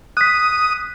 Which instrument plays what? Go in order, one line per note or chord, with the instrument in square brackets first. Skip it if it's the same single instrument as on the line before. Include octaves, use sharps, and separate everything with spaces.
[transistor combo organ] D#6 [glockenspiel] F#6 B6